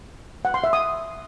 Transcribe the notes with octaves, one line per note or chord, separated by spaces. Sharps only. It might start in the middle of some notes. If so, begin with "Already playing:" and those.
F#5
C6
E5
D#6